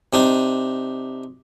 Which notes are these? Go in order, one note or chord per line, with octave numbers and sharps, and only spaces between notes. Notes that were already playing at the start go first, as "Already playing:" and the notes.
C3 D4 D#4